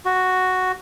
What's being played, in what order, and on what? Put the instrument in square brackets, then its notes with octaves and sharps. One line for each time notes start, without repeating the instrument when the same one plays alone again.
[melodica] F#4